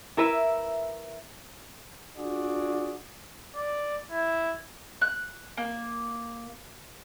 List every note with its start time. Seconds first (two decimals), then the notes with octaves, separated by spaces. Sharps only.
0.17 E4 A#4 B4 E5
2.17 D4 F4 F#4 G#4 D5
3.55 D5
4.11 E4
5.02 F#6
5.57 A#3